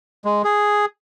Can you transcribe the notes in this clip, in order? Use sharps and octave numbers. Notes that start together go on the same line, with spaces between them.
G#3
G#4